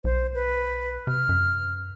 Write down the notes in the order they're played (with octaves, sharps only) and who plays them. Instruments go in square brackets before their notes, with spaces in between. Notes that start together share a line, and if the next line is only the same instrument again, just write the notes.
[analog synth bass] B1 [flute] C5
[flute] B4
[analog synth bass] C3 [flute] F6
[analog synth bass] F#2